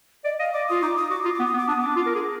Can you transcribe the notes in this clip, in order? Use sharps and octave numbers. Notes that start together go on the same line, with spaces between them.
D5 D#5
D#5 F5
D5 D6
F4 D#6
D#4 D6
D#6
F#4 D6
F4 D#6
D6
B3
D#6
B3
D6
D4 D#6
B3
D6
D4
F4
A#4
G#4